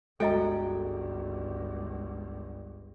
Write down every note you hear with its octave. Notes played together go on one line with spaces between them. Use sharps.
G1 C#2 G#3 F#4 A4 D#5 G5 A#5